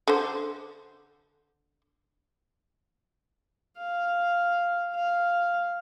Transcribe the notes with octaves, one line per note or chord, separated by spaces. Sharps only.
D3 C5
F5
F5